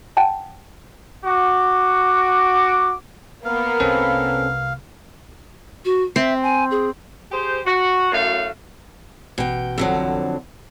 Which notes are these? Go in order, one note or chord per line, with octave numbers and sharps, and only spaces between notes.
F#5 G5 A5
F#4 D6
A#3 B3 F5
C2 C3 C4 C#4 A4
F#4
C4 E5
G#5
G#4
G4 G#4 C5
F#4
F#2 A2 A3 F#4 F5
A1 B2 G5
F2 D3 F#3